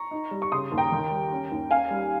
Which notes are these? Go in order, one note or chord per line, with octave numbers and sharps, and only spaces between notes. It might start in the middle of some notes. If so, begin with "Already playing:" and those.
Already playing: A#5 C#6
D#4
G3
C#6
C#3 C6 D#6
D#2
G5 A#5
D#3
G3
C#4
D#2
C#4 F5 G#5
G3